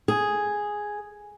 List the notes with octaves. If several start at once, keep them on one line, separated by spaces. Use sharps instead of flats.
G#4